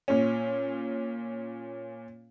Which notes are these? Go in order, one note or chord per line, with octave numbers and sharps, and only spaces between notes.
A#2 C#4